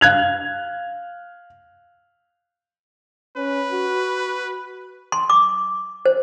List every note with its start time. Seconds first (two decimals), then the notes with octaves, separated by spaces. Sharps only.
0.01 F5 F#6 G#6 F7
3.37 C#4 B4
3.72 F#4
5.12 C6
5.30 D6
6.06 C5